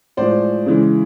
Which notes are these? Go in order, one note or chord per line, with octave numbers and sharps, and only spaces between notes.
A2 F3 G#3 C5 D5
C#3 E3 G#3